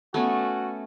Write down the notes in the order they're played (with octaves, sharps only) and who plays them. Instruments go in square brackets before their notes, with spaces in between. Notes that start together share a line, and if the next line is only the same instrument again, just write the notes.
[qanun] A3 B3 C#4 [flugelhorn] F#4